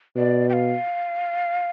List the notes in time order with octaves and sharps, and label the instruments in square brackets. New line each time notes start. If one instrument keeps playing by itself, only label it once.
[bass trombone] B2 [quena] D5
[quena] G5
F5